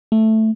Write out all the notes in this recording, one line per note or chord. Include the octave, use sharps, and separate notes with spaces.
A3